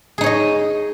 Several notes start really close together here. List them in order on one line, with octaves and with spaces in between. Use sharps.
G#4 D#4 C#5 D#5